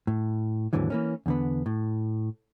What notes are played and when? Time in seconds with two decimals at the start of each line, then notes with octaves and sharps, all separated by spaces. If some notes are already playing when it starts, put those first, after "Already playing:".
0.07 A2
0.73 D#2 G#2 D3 E3 F#3
0.90 E3 A#3 C#4
1.26 E2 D3 B3
1.66 A2